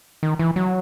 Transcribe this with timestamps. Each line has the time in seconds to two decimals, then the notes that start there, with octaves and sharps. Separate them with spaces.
0.23 D#3
0.39 E3
0.56 F#3